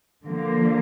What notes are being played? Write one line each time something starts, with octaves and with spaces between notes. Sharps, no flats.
D3 F3 A#3